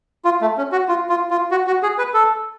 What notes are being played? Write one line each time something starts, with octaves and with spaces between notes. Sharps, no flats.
F4
A3
C#4
F#4
F4
F4
F4
F#4
F#4
G#4
B4
A4